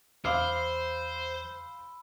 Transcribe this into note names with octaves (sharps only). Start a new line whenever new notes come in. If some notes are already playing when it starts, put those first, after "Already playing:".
E2 C5 F5 B5 C6 D6 E6 F6